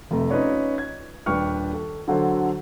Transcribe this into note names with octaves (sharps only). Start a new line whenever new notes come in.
F1 A3 A#5
C#4 D#4 F4 B4 C#5 D5
G#6
D#1 D4 B4 G5 C#6 F6
A4
D3 F#3 F#4 A4 C5